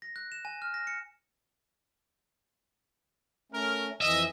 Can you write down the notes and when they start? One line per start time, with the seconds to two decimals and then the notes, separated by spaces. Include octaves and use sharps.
0.02 A#6
0.16 F#6
0.32 E7
0.45 G#5
0.62 F6
0.74 A#6
0.87 C#7
3.52 A3 C#4 A#4
4.01 F2 E3 D#5 E5